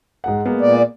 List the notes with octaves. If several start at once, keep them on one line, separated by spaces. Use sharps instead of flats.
G#2 G#3 F#5
G#3 A#3 B3
A#2 D5